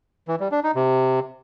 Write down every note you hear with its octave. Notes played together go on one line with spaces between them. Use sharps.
E3
G3
D4
D#4
C3